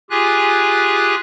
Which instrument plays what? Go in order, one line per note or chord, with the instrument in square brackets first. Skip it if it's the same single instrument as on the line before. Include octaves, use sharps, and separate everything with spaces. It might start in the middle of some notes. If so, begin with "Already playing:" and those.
[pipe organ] F4 G4 G#4 G#5 F#6